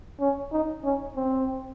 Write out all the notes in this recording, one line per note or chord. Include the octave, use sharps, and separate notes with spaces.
C#4
D#4
C#4
C4